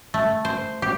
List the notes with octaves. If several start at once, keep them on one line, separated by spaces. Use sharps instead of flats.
A3
C5
G4